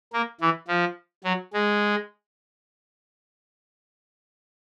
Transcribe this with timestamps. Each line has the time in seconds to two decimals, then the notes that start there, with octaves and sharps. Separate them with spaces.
0.13 A#3
0.41 E3
0.68 F3
1.24 F#3
1.53 G#3